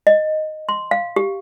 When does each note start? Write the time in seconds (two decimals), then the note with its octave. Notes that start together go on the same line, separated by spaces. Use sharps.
0.07 D#5
0.69 C6
0.91 F5
1.16 G4